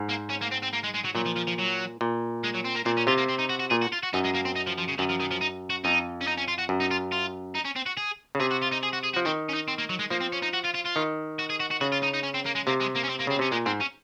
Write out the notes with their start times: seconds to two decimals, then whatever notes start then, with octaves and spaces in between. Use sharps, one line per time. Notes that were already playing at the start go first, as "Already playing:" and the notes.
Already playing: G#2
0.09 A#3
0.30 C#4
0.41 A#3
0.51 C4
0.62 C4
0.73 A#3
0.83 G#3
0.94 G#3
1.04 F#3
1.15 A#2 F#3
1.26 F3
1.36 F3
1.47 F3
1.58 F#3
2.01 A#2
2.44 G#3
2.54 F#3
2.64 C4
2.75 A#3
2.85 A#2 C4
2.97 C#4
3.07 C3 F4
3.17 A#3
3.29 C4
3.39 D#4
3.50 F#4
3.60 F#4
3.71 A#2 G#4
3.82 F#4
3.93 F4
4.03 F#4
4.13 F#2 D#4
4.24 G#3
4.34 A#3
4.45 C4
4.56 D#4
4.67 F3
4.78 F3
4.89 C#3
4.99 F#2 D#3
5.10 F3
5.20 D#3
5.31 F3
5.41 D#4
5.70 F#4
5.84 F2 D#4
6.21 C#4
6.27 D#4
6.38 C#4
6.48 F4
6.58 F#4
6.69 F#2
6.80 D#4
6.91 F4
7.12 F4
7.55 D#4
7.65 C#4
7.76 C4
7.86 F#4
7.97 G#4
8.35 C#3
8.40 C3 G#4
8.51 F#4
8.62 F4
8.72 D#4
8.83 G#4
8.93 F#4
9.04 G#4
9.14 F3 F#4
9.26 D#3 C4
9.49 C#4
9.54 D#4
9.68 C4
9.78 A#3
9.89 F#3
9.99 G#3
10.10 F3 A#3
10.21 C4
10.32 C#4
10.42 D#4
10.53 F#4
10.64 F4
10.74 F4
10.85 F4
10.96 D#3
11.39 F#4
11.50 G#4
11.60 F#4
11.71 F#4
11.81 C#3 F#4
11.92 F4
12.03 D#4
12.14 D#4
12.23 C#4
12.34 C4
12.46 A#3
12.55 G#3
12.67 C3 A#3
12.80 G#3
12.95 A#3
13.03 C#4
13.09 C4
13.19 A#3
13.27 C#3 C4
13.39 C3 C#4
13.52 A#2 G#3
13.66 G#2 C4
13.80 C#4